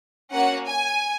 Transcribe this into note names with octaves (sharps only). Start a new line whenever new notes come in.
A#3 C#4 F#4 F#5
G#5